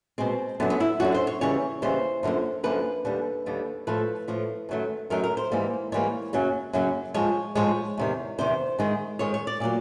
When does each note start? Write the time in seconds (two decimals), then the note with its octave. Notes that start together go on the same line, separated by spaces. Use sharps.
0.18 B2 G#3 C4
0.60 F#2 D3 F#3 B3
0.70 B3
0.80 E4
1.00 F#2 D3 F#3 F#4
1.14 C5
1.27 C#5
1.41 D#2 C#3 E3 G3 C#5
1.82 D#2 C#3 E3 G3 C5
2.23 F#2 D3 F3 A#3
2.64 F#2 D3 F3 A#3 B4
3.05 D#2 D3 G3
3.46 D#2 D3 G3
3.87 A2 F3 A3 B4
4.28 A2 F3 A3
4.69 F#2 D#3 F#3 A3
5.10 F#2 D#3 F#3 A3 A#4
5.24 A#4
5.37 C5
5.52 G#2 E3 G3 A#3
5.92 G#2 E3 G3 A#3 C#5
6.33 F#2 C#3 F#3 A#3
6.73 F#2 C#3 F#3 A#3
7.14 G#2 F3 G#3 C#5
7.55 G#2 F3 G#3 C#5
7.98 E2 C3 D#3
8.38 E2 C3 D#3 C5
8.79 G#2 D#3 G#3
9.19 G#2 D#3 G#3 C#5
9.34 C#5
9.47 D5
9.60 A#2 F#3 A#3 D5